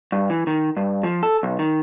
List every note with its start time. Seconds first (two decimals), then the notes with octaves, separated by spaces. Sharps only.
0.12 G2
0.30 E3
0.47 D#3
0.77 G2
1.03 F3
1.23 A4
1.43 B1
1.59 D#3